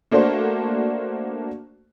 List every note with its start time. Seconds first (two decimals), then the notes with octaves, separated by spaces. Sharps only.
0.11 A3 A#3 D4 F#4 C5